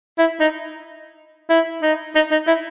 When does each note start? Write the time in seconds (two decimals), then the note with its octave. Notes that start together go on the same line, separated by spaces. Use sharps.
0.18 E4
0.40 D#4
1.50 E4
1.82 D#4
2.15 D#4
2.31 D#4
2.47 E4